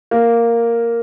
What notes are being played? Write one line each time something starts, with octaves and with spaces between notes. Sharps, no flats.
A#3